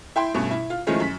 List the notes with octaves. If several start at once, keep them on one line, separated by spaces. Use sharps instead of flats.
E4 G5 C6
G2 B2 A3 C#4
E4
F4
D#3 F3 G#3 A3 C#4 E4
F#2 B6